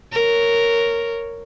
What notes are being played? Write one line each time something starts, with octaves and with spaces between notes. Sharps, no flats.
A#4 C#5